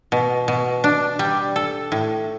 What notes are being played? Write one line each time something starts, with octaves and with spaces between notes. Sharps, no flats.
B2
B2
D4
G3
A4
A2